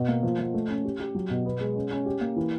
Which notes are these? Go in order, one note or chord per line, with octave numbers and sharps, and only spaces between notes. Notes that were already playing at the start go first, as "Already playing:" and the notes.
Already playing: B2
A#3
F3
F3
A3
C#4
G4
G4
F#3
B2
B3
G#3
C#4
C#4
G4
A#3
E3